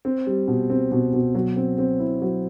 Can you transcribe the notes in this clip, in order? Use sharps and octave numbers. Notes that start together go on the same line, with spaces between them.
C4
G3
B2
C4
B2
B2
F#3
C4
C4
E4
F#3